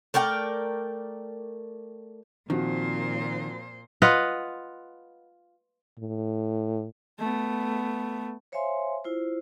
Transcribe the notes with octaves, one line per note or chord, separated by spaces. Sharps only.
A3 A#4 D5 G5
A#2 D#3 F3 C4 F#4 C5
F4 B4 D#5 F#5
A2
A3 B3
C5 C#5 E5 F5 G#5 C6
E4 F4 C5